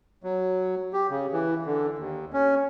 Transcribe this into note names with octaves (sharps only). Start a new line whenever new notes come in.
F#3
G4
C#3
E3
D3
D#2
C#4